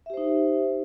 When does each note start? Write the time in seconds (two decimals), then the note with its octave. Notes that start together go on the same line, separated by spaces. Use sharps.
0.06 E5
0.10 G4
0.14 C5
0.17 D#4